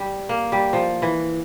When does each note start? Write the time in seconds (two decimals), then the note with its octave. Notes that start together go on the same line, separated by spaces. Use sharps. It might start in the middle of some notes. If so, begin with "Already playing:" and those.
Already playing: G3
0.29 A#3
0.52 G3
0.73 F3
1.02 E3